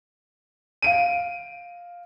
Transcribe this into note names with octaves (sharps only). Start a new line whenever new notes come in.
F5 D7 D#7